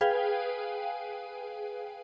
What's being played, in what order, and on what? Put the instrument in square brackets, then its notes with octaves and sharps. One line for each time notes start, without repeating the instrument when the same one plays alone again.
[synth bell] G#4 B4 F5 G5 G#5